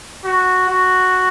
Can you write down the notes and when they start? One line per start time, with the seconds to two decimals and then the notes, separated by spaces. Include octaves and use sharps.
0.25 F#4
0.69 F#4